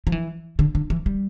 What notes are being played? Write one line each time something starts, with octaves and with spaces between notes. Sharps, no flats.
F3
E3
D3
D3
E3
G3